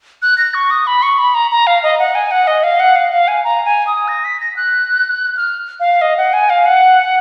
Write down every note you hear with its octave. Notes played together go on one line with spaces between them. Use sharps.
F#6
A#6
C#6
D#6
B5
C#6
B5
A#5
A#5
F5
D#5
F#5
G#5
F#5
D#5
F5
F#5
F5
F5
G#5
A#5
G#5
D#6
A#6
B6
A#6
F#6
F6
F5
D#5
F#5
G#5
F5
F#5